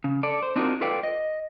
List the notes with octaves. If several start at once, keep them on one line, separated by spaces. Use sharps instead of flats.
C#3
A4 D5
C5
C4 D4 D#4 F4 F#4 A#4
F4 A4 B4 D5 F5 G5
D#5